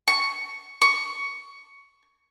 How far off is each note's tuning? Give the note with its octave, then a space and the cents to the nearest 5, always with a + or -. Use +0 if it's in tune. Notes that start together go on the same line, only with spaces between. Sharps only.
C#6 +5
C#6 +10